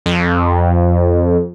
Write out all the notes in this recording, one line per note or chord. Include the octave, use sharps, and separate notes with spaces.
F2